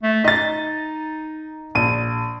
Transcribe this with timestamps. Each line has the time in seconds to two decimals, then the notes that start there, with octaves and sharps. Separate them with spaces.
0.03 A3
0.24 D#4 D#5 A6
1.75 A#1 D#7